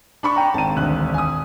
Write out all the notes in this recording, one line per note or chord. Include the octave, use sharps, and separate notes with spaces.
D4 B5 C#6
G5 A#5
G#1 A5 D#7
E1 D2 F#6
G#5 D#6